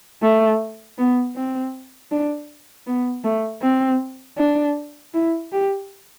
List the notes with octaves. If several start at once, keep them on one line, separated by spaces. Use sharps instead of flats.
A3
B3
C4
D4
B3
A3
C4
D4
E4
G4